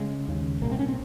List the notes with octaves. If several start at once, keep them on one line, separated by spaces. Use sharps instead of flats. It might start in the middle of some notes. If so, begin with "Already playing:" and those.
Already playing: C#3 G#3
D#2 C#3
C2 A#2 A#3
C4
C#4
C4